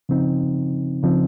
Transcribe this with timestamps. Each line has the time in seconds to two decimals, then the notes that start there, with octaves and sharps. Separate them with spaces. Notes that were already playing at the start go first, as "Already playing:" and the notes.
0.09 C#3 F3 C4 D#4
1.02 C#3 F3 C4 D#4